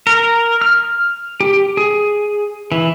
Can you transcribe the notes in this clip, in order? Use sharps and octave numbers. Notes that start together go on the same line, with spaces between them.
A#4
F6
G4
G#4
E3